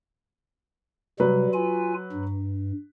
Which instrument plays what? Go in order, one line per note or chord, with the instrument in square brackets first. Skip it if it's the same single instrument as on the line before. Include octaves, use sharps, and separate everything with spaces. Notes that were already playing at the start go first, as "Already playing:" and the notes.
[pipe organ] C3 G3 [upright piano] F#3 B4
[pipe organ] F4 G#5
G2